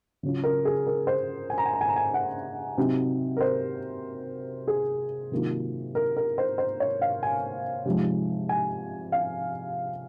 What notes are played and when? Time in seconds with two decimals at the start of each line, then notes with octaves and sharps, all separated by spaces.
0.23 C#3 F#3 C#4 F4
0.44 A#4
0.65 G#4
0.87 A#4
1.07 C5
1.50 G#5
1.58 A#5
1.66 G#5
1.73 A#5
1.81 G#5
1.88 A#5
1.96 G#5
2.14 F#5
2.77 C3 F#3 C4 D#4
3.37 A#4
3.41 C5
4.68 G#4
5.32 C3 D#3 F#3 A#3 F4
5.95 A#4
6.17 A#4
6.38 C5
6.58 C5
6.80 C#5
7.02 F5
7.23 G#5
7.85 C3 F3 G#3 D#4
8.49 G#5
9.12 F5